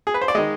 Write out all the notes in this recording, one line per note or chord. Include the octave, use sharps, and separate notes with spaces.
G#4
B4
C5
D5
D#3 G#3 D#5